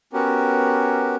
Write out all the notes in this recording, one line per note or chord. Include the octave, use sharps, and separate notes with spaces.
B3 C#4 F#4 G4 A#4